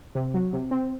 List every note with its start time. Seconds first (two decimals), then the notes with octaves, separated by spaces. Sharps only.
0.15 C3
0.34 F#3
0.53 C3
0.71 C4